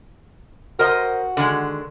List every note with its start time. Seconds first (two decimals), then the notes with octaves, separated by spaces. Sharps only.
0.79 F#4 A#4 C5 D#5
1.37 D3 D#3 G#3